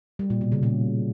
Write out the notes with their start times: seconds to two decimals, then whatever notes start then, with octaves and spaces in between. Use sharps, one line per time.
0.19 G3
0.30 A#2
0.41 B2
0.52 C#3
0.63 A#2